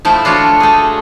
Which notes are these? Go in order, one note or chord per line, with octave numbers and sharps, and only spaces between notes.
F3 A3 E4
D4 F4 F#4 C#5
A3 G#4